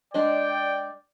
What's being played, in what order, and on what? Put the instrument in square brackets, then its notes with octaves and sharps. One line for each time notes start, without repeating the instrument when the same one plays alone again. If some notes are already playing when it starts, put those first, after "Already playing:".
[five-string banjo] G#3 D4 D#5 [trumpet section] D5 G5